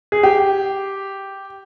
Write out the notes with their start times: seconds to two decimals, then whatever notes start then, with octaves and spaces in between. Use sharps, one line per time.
0.12 G#4
0.23 G4